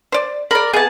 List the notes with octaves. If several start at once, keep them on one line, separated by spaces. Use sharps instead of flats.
C5 D5
A#4 D5 B5
C3 B3 G#4 A5